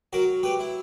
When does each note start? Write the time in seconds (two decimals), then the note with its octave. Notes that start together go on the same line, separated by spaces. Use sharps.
0.13 F#3 F#4 A#4
0.43 G4 B4
0.59 E4